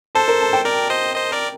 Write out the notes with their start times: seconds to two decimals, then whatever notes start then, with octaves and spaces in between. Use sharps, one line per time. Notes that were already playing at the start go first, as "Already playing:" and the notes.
0.15 A4 C5 A5
0.28 A#4
0.41 A5
0.53 G5
0.65 A#4 D5
0.90 C5 D#5
1.15 C5 D#5
1.32 A#4 D5